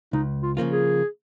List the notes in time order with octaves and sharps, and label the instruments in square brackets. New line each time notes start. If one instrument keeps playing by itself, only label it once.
[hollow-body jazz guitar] C#2 [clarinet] D#4
[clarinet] F4
[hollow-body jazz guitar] C#3 F3 A#3 F4
[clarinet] G#4